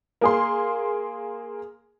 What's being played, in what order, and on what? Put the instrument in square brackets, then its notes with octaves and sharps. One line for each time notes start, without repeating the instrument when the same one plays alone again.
[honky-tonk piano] A#3 G#4 C6